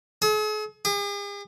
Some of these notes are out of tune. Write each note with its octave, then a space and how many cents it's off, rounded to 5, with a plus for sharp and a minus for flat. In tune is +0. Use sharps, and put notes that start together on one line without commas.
G#4 +45
G#4 -45